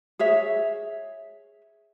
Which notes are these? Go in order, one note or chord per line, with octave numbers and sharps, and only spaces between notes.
G#4 C#5 E5